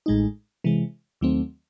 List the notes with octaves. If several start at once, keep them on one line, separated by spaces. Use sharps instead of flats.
A1 A2 G#3 D#4
C3 E3 G#3
D#2 D#3 F#3 A3 C4